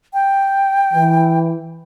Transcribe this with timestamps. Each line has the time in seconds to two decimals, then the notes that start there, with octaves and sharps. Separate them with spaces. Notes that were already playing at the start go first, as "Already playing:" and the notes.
0.14 G5
0.93 E3